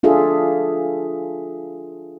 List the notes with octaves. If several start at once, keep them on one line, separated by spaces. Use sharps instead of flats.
D4 F4 G#4 A4 E5